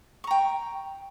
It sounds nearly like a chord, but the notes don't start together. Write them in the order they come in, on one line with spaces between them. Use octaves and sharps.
C#6 A#5 G5